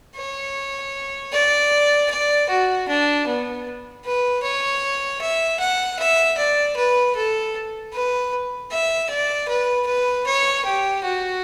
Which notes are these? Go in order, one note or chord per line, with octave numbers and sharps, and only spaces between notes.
C#5
D5
D5
F#4
D4
B3
B4
C#5
E5
F#5
E5
D5
B4
A4
B4
E5
D5
B4
B4
C#5
G4
F#4